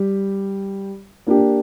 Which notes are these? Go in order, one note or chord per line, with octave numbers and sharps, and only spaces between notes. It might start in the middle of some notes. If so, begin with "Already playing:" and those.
Already playing: G3 G4
A#3 D4 G4